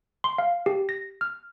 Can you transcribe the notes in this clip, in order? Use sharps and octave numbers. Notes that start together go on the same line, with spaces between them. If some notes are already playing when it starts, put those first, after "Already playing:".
C6
F5
G4
A#6
F6